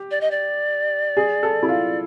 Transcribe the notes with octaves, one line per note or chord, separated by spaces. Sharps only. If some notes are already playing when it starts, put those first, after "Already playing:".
Already playing: G4
D5
D#5
D5
G#4
A4
E4
F4